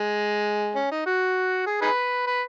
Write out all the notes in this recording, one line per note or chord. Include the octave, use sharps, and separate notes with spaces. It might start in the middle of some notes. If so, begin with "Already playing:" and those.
Already playing: G#3
C#4
D#4
F#4
G#4
D#4 G#4 B4
B4